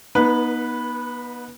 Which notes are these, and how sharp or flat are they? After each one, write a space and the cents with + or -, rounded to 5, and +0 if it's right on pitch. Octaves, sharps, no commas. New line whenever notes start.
B3 -35 D#4 +0 B4 -5